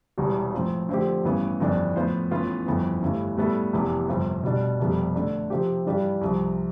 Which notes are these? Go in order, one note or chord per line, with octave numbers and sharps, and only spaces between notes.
E1 E2 C3 G3
A2 F3 C4 F4
D3 F3 A3 C4 G4
A1 G2 E3 B3
G1 F2 E3 B3 D4
A2 F3 B3 F4 C5
A1 A2 E3 B3 F4
G1 F2 E3 B3
G1 G2 E3 A3
A2 G3 B3 E4 A4
F1 E2 C3 E3 B3
G1 F2 C3 F3
B2 G3 D4
F1 F2 C3 G3 B3
D3 A3 D4
C3 F3 C4 G4
G2 E3 G3 D4 G4
C2 C3 F3